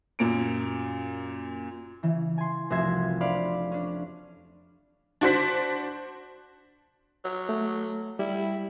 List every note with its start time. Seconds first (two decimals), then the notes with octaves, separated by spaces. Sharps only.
0.19 F#2 A#2 D7
2.03 C#3 E3
2.38 G#5 C6
2.70 F1 C2 F#4 E5 C6 G#6
3.20 D4 C5 D5 F5 B5 C6
3.72 C#4 D4
5.21 D4 F#4 C5 B6
7.25 F#3
7.49 A3
8.19 G3 E4